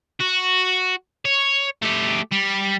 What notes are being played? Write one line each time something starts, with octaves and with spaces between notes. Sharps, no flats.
F#4
C#5
A3 G4
G3